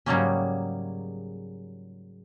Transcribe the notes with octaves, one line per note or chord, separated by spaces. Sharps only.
G#2 C#3 F#3 G3 A#3 C#4